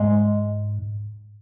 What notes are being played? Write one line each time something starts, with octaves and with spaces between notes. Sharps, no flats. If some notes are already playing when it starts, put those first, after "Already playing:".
Already playing: G#2 G#3